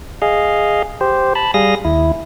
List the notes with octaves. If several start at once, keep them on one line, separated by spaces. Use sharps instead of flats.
G#4 D#5 F5
G4 C5
A5 B5
G3 G#4 F5 D#6 A#6
D#2 E4